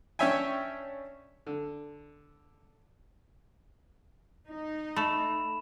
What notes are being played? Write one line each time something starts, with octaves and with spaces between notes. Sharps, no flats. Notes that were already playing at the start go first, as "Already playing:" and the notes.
C#4 D4 C#5 E5 G5 G#5
D3
D#4
A3 B5 E7